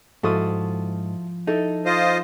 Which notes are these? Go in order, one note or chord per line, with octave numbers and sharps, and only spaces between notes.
G#2 F3 E4 F#4 A4 F5 D#6
D#4 E4 A4
F4 C5 D#5